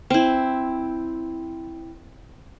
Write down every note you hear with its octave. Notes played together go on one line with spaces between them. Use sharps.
C4 E4